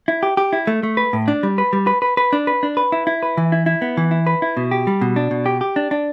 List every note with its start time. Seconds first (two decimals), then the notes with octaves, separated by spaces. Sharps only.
0.08 E4
0.23 G4
0.37 G4
0.53 E4
0.67 A3
0.83 A3
0.97 B4
1.13 A2
1.28 D4
1.43 G3
1.58 B4
1.73 G3
1.87 B4
2.02 B4
2.17 B4
2.33 D4
2.47 B4
2.63 D4
2.77 B4
2.92 E4
3.07 E4
3.23 B4
3.37 E3
3.52 E4
3.66 E4
3.82 B3
3.97 E3
4.11 E4
4.27 B4
4.42 E4
4.57 B2
4.71 G4
4.87 G3
5.01 B2
5.16 D4
5.31 B2
5.46 G4
5.61 G4
5.76 D4
5.91 D4